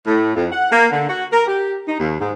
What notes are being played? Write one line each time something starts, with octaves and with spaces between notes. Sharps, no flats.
A2
F2
F#5
A#3
D3
F#4
A#4
G4
D#4
D#2
G#2